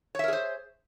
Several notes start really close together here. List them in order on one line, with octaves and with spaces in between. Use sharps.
C#5 E5 A#4 G#4 C5